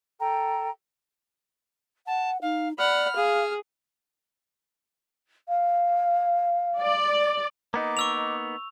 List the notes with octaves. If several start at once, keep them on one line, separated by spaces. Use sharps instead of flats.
A4 G5 A#5
F#5 A5
D#4 F5
D5 F#5 B5 F6
G#4 F5
F5
D5
A#3 B3 D#4 D#5 A#5 D6
C#6 E6 F7